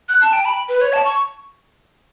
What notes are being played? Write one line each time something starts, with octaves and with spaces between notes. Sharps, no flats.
F#6
A5
G5
B5
B4
C#5
A5
C#6